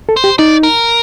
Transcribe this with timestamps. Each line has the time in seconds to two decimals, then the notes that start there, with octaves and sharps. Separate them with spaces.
0.09 A4
0.17 C5
0.24 G4
0.39 D#4 D5
0.63 A#4